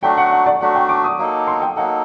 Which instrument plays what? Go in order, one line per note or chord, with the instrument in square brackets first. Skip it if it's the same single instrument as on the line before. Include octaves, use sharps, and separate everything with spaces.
[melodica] F#3 A3 D4 F#4 [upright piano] G5
[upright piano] F#5
F#5
D5
[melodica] F#3 A3 D4 F#4 [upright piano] F#5
[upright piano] G5
D6
D#6
[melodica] F#3 A#3 D#4 A4
[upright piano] C6
G5
[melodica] F#3 A#3 D#4 A4 [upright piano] F#5